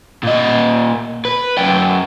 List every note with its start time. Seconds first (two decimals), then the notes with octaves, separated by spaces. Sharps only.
0.23 A#2 D#5
1.25 B4
1.58 F#2 G5